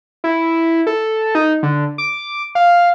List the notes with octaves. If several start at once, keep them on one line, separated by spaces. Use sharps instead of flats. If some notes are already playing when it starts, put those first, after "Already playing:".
E4
A4
D#4
D3
D6
F5